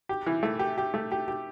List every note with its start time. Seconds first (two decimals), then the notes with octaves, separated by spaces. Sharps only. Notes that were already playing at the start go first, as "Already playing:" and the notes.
0.09 G4
0.27 E3
0.43 A3
0.59 G4
0.78 G4
0.94 A3
1.12 G4
1.28 G4